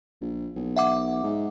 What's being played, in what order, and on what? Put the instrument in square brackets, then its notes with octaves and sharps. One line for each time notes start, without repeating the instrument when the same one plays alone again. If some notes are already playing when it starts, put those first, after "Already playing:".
[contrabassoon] A#1
B1
[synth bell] E5 F#5 D6
[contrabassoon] G#2